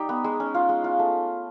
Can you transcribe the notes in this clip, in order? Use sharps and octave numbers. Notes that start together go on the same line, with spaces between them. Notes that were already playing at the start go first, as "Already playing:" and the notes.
Already playing: G3 D#4 G4
B3
G#3
C#4
F4
G#3
F4
A3